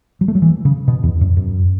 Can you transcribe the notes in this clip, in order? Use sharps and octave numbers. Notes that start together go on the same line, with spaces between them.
F#3
A3
F#3
E3
C#3
B2
E2
F#2
F#2